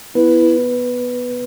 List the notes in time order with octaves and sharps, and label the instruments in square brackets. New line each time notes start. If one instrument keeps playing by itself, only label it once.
[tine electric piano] B3 B4 [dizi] E4